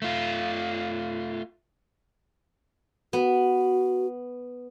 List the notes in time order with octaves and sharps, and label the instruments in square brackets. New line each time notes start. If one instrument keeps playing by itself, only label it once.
[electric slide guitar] A3 F4
[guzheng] B3 [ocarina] F#4